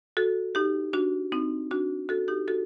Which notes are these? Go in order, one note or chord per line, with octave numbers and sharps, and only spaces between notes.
F#4 A4
D#4 G4
D4 F#4
C4 D#4
D4 F#4
F#4 A4
D#4 G4
F#4 A4